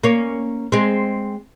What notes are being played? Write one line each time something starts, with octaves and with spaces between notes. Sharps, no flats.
A#3 C#4
G#3 C4